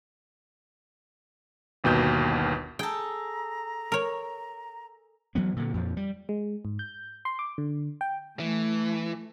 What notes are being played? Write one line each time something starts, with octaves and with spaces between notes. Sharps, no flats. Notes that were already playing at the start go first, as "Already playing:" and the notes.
G1 D#2 B2 G6
G#4 A4 G5 A#5
A#4 C#5
E3 F#3 A#3 B3
A#2 D3
F2 A#2 F3
G3
G#3
G#2
G6
C6
D6
D3
G5
E3 A3